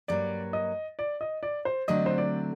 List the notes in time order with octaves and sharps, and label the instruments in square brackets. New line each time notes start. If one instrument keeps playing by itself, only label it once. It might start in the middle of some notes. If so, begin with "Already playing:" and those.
[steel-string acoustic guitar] G2 F#3 A#3 [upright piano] D5
[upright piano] D#5
D5
D#5
D5
C5
[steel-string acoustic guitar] D3 F#3 A3 C4 [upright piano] D#5
[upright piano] C5
D5